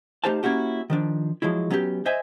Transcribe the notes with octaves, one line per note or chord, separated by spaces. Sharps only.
A3 D#4 G4 C5 F5 A5
A#3 C#4 E4 F#4 G4
D#3 F3 D4
F3 F#3 G#3 E4
F#3 B3 C#4 F#4 G4
C5 D#5 E5 G#5